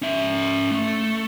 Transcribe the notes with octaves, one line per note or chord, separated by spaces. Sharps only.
C#4 E5
A3